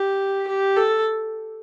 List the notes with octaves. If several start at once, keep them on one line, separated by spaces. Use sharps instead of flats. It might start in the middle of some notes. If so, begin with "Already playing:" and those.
Already playing: G4
G4
A4